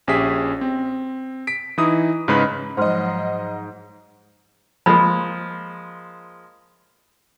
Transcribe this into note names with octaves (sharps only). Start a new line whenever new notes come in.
A#1 C#4 G4 G#4 E5 B6
C4
B6 D7
E3 D#4 E4 D#6
G#2 C#3 G#3 D#4 B4 B5
G#2 F3 F#3 C5 D#5 F#5 C6 F6
F3 G#3 A#3 B5